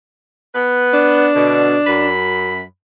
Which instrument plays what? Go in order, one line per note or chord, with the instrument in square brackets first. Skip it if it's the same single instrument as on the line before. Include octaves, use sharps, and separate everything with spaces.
[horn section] B3 B4
[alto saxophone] D4
[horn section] B2 D3
F#2 B5